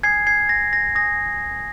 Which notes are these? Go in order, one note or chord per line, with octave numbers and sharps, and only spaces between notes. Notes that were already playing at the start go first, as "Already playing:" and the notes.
G#5 D#6 G#6 C7
G#6 C7
A#6
A#6
G#5 D#6 A#6